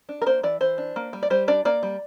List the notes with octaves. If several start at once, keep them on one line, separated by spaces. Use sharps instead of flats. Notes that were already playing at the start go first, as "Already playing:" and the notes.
D4
A#4
A#3 C5
E3 D5
E3 C5
D4
A#3
G3
D5
G3 C5
D4 D5
A#3 D5
G3